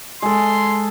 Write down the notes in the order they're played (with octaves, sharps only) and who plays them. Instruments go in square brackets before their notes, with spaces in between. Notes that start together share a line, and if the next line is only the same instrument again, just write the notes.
[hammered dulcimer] G#3 A4 [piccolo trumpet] C6